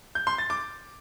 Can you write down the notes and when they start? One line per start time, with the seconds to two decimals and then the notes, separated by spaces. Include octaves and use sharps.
0.15 G6
0.27 C6
0.38 A6
0.50 D6